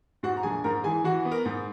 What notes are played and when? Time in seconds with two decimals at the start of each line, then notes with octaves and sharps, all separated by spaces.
0.23 G#2 F#4 F#5
0.37 A#5
0.43 A#1 G#4 G#5
0.64 G#2 A#4 A#5
0.84 E3 G#4 G#5
1.04 E3 F#4 F#5
1.25 B3
1.31 A#4 A#5
1.45 G#2